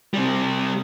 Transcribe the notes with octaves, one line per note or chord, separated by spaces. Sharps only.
C3 G3